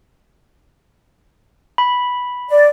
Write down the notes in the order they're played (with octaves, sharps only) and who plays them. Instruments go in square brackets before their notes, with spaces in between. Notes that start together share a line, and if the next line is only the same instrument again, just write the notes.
[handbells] B5
[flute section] D5